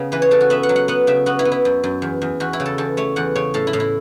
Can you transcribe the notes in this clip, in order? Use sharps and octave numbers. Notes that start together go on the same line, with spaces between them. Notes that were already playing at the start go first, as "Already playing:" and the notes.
Already playing: C#3 B3
E3 B4
C#5
C#3 A4
F#4
B3 E5
F#5
F#3
F#5
B3 F#5
C#3 E5
B3 F#4
E4
B3
E4
F#2
F#2
E2
E2
E2 F#4
E4
C#3
A4
E2 A4
A3 C#5
E2 F#5
C#3 C#5
A2 A4
E4
A2
E4